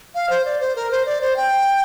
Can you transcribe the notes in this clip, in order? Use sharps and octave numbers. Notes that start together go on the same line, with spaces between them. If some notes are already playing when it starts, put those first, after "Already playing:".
F5
C5
D5
C5
A#4
C5
D5
C5
G5